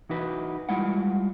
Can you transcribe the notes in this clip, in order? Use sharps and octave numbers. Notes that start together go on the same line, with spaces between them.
E3 D#4 F#4 B4
G3 G#3 E4 F4 F#5